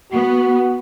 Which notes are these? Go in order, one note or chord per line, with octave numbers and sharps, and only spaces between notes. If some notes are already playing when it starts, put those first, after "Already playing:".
B3 F#4